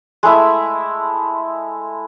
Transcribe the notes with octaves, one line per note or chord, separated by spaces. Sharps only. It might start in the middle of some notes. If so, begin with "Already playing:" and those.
G#3 A3 E4 E5